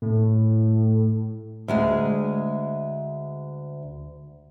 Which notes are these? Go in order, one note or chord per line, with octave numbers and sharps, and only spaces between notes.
A2
D2 G#3 G#4